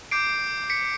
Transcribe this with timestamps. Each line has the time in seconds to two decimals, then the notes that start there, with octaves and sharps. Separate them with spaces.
0.11 D6 G6 C7 D7
0.70 B6 C#7